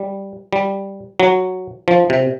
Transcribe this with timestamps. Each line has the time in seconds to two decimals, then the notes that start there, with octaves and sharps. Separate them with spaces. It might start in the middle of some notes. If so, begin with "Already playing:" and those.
Already playing: G3
0.53 G3
1.20 F#3
1.88 F3
2.10 C3